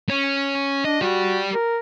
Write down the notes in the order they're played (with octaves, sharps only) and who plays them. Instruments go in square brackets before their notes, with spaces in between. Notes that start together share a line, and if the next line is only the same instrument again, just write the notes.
[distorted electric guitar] C#4
[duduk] D4 [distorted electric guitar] D#5
[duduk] F#4 [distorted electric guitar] G4 D5
[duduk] A#4